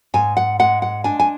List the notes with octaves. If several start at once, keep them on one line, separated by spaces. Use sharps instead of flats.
G#2 G#5
F#5
G#3 F#5
F#5
D4 G#5
G#5